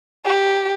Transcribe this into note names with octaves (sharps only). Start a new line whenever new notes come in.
G4